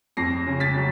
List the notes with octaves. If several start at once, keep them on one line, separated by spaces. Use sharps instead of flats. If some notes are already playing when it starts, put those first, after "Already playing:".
F2 A#6 C7
C#3
A6 B6
F#3